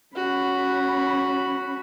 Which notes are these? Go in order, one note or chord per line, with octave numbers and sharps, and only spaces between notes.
C#4 F#4 B5